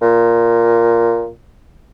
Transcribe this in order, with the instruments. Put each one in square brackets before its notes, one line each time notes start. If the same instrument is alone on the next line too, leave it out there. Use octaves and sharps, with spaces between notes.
[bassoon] A#2